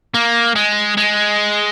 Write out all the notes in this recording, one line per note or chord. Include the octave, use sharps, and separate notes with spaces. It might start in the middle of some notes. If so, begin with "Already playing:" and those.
A#3
G#3
G#3